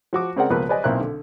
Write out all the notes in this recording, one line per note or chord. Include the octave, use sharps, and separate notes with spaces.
F3 F#4 D6
C#3 G#3 C4 A#4 D5 F#5
C#2 B2 F3 A#3 A#4 B4
B4 C5 D5 D#5 G#5
B1 A#2 C4 E4 A#4 F#6
D3